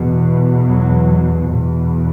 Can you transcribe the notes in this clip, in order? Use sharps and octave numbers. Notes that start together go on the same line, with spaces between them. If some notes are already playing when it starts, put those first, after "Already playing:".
Already playing: E2 B2
F#3
E2 B2